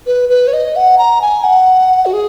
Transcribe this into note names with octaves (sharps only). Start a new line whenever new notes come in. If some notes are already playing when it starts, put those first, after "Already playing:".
B4
B4
C#5
D#5
F#5
A#5
G#5
F#5
F#4
G#4